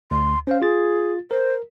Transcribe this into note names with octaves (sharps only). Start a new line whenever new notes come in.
D2 C6
C#4 C5 F5
F4 G#4 A6
A#4 C5